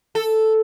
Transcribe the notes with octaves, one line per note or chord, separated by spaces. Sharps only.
A4